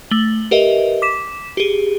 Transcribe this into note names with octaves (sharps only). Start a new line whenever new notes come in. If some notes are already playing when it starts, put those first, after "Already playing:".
A3 F#7 G7
G4 A#4 B4 D#5 E5
D6 B6 E7
G4 G#4